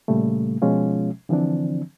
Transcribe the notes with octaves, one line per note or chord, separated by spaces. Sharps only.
A#2 C#3 G3 A3
B2 F3 G#3 C#4 F4
D3 E3 F3 C4 D4